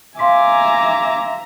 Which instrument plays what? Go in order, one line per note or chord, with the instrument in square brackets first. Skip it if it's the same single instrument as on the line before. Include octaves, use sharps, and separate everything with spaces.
[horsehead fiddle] E5 A#5 [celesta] F5 C6 B6 [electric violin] G#5 D6